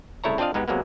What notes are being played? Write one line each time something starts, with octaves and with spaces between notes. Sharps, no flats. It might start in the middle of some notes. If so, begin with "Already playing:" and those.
C2 C#3 A3 E4 C#5 A#5
C4 D4 F4 D5 D#5 F5
G#2 G#3 B3 D#4 G4
C3 F#3 G#3 A#3 B3